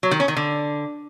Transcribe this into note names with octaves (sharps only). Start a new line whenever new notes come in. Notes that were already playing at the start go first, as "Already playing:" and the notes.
F#3
D#3
C#4
D#3
D3